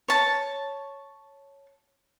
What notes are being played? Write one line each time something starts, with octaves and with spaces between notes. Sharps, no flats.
C#5 A5